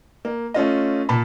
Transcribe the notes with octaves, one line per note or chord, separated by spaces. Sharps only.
A#3
A3 C#4 F4 D#5
A#2 A5 B5